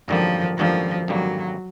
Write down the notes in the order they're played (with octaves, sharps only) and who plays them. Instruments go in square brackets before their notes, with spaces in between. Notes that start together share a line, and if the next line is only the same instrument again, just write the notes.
[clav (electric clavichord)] G#1 F#2 D3 G3 A#3 [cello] F3
[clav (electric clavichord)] G#1 F#2 D3 G3 A#3 [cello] F3
[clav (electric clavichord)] G#1 F#2 D3 G3 A#3 [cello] F#3